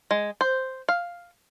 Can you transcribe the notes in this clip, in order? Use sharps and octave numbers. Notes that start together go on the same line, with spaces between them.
G#3
C5
F5